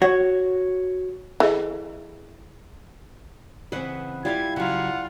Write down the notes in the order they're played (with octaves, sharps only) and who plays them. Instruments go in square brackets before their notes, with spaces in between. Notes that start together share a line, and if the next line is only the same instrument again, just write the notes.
[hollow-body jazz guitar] F#4 C#5
[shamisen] E3 [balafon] G#4 A4 D#5
[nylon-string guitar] C#3 E3 C4 [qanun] B4 D#5 F#5
[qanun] G3 E4 F5 [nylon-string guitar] F4 [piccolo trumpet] G#6
[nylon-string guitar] C#3 F#3 [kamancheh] F4 [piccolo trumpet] F#5